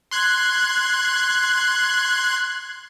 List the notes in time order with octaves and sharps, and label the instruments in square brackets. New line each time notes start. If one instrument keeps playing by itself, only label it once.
[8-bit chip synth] C6 F#6 G#6